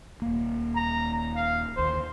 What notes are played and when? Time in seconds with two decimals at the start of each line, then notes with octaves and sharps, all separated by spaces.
0.22 D#1 A#3
0.76 A#5
1.36 F5
1.77 G1 D#2 C5